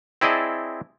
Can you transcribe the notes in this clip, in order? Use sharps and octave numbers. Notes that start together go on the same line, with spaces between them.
C4 E4 G#4 D5 D#5 A5